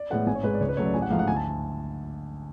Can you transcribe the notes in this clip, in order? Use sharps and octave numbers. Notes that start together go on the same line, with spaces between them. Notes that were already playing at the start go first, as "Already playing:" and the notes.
Already playing: D5
A2 G#3 B3 F#5
G#1 G#5
C#5
G#2 G#3 B4
D5
C#2 C#5
B4
C#3 F#3 A3 C#5
D5
A1 G#5
F#5
G#2 F3 A3 F5
F#5
D2 G#5
A5